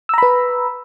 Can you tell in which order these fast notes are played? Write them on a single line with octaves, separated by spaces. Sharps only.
E6 A#5 B5 B4